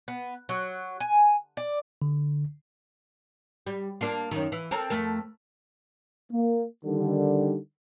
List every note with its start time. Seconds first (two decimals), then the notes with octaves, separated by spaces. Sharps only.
0.08 B3
0.49 F#3
1.00 G#5
1.57 D5
2.02 D3
3.67 G3
4.01 A#3 D4 F4
4.31 F#2 D#3
4.52 E3
4.71 C4 A4 A#4
4.90 F2 A3 A#4
6.32 A#3
6.85 D3 D#3 G3